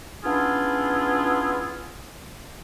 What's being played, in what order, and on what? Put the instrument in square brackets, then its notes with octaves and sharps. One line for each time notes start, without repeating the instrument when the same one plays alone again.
[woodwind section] B3 C#4 D4 E4 F4 G#4